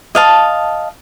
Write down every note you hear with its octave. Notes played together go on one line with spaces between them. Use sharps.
D#5 F5 A5